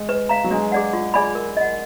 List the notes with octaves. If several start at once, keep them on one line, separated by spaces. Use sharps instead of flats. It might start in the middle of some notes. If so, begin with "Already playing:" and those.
Already playing: G#3
B4
F5 A#5
F#3
G#3 D4
G#4 D5 F#5
F4
G#4 D5 G#5 B5
A#4
D#5 F#5